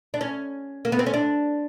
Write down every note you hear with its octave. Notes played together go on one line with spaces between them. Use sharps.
D4
C#4
A#3
B3
C4
C#4
D4